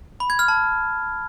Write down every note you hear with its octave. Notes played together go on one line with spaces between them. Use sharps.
B5
G#6
F6
A5